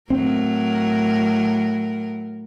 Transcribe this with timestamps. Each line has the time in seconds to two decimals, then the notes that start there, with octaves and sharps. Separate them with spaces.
0.10 A2 F#3 C4 A#4